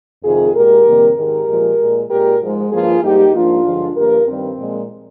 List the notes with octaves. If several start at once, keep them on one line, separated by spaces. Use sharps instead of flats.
F2 C3 D#3 F4 G#4
A#2 G#3 G4 A#4
F2 C3 D#3 G3 A#3
G#2 D#3 G#3 G4 A#4
A#2 F3 G#3
A#2 G#3
A#2 G#3 G4 A#4
G#2 F3 G#3
G2 F3 A#3 F4 G#4
G#2 G3 A#3 D#4 G4
G#2 F3 A#3 D4 F4
G2 D3 F3 G#3
G2 F3 A#3 G4 A#4
G2 D#3 G3 C4
A#2 F3 G#3